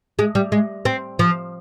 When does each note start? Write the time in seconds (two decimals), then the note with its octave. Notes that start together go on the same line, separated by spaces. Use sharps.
0.19 G#3
0.35 G3
0.52 G#3
0.85 C4
1.19 F3